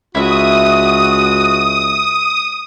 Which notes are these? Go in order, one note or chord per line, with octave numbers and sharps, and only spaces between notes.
C#2 E4 F#4 E5 D#6